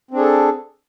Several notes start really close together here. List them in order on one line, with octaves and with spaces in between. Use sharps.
C4 D4 G#4 A4